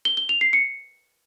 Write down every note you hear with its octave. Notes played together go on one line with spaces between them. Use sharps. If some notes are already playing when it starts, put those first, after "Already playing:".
G7
G7
F7
C7
C#7